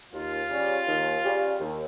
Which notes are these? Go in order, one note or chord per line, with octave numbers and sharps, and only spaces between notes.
D#2 F4
C#3 G3 C#4
D#2
C#3 G3 C#4
D#2